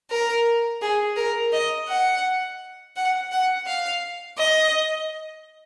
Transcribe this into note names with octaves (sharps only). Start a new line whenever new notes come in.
A#4
G#4
A#4
D#5
F#5
F#5
F#5
F5
D#5